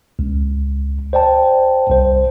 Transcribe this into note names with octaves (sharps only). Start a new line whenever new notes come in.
C#2
C5 D5 G5 A5
C2 C5